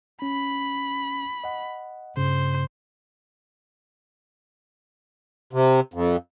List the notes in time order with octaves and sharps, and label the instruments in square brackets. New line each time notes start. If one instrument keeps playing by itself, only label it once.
[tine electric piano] C#4 [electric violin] B5
[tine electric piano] D#5 F#5
[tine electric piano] G2 C#3 [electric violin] C5
[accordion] C3
F2